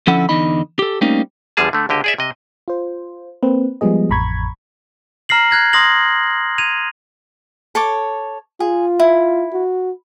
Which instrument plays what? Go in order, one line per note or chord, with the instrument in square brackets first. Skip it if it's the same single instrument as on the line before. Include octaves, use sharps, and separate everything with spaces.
[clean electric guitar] D3 F3 C#4 E4 A4 F#5
E2 D3 D#4 D#5 B5
G4 A4
G3 A3 A#3 C4 C#4 D#4
[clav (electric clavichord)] E2 D3 F3 G3 G#4 A5
D3 A3
C#2 D3 G4 D#5
G#4 D5 E5
C3 D#5
[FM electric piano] F4 C5
A#3 C4 B4
F3 G3 G#3 B3 G#4 D#5
A1 F2 A#5 B5 C#6 G#6
[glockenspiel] A#5 F6 A#6 C7 F#7
F#6 G#6 A#6
C6 D#6 A#6 F#7
G#6 D#7 F7
[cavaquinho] A4 C#5 D6
[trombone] F4 [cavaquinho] G#4
[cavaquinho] E4
[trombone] F#4